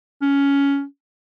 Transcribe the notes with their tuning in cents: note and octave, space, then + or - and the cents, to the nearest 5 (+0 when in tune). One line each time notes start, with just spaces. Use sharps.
C#4 +15